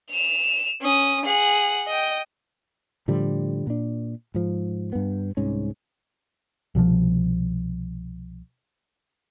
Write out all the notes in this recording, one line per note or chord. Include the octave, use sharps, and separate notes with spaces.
E7 F7
C#4 D#6
G#4 F#5
D#5 G5
A2 D3 F3 G3
A#2 D4
G#2 F3
G2 B3
C2 G#2 C#4
C2 B2 D#3 F3